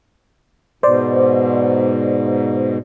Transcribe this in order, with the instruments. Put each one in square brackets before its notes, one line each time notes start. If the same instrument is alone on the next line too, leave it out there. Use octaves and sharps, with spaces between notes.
[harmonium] G#2 B2 [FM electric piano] C5 D5